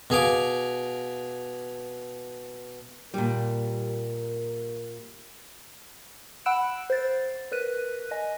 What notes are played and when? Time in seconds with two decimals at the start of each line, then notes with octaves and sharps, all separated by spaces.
0.10 B2 G#4 F5 D6
3.14 A#2 G3 A#4
6.46 F#5 B5 E6 F#6 D7 E7
6.90 C5 A6
7.52 A#4 B4 F#6 D#7
8.11 D#5 G#5